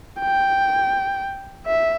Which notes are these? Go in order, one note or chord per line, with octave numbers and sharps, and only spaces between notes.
G5
E5